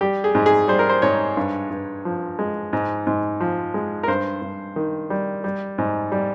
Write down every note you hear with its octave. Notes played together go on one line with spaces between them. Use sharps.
G3 G4
G#4
G#2
G#4
G3 C5
A#4
C5
G#2 C#5
G2
G2
F3
G#3
G#2
G#2
F3
G#3
A#4
G2 C5
G2
D#3
G3
G3
G#2
G3